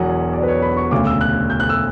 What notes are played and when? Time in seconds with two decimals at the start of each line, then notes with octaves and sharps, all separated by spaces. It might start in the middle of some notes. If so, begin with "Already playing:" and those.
Already playing: E1 E2 B2 F#3 F#5
0.33 D5
0.43 B4
0.48 C#5
0.62 B5
0.77 C#6
0.91 E1 D2 C#3 D6
1.06 E6
1.21 F#6
1.50 G6
1.60 F#6
1.69 E6